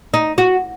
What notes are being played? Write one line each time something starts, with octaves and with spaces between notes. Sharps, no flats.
D#4
F#4